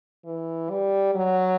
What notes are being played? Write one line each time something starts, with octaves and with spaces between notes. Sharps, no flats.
E3
G3
F#3